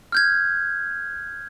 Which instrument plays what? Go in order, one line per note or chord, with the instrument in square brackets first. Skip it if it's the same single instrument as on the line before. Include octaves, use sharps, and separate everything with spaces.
[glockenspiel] F6 G6 G#6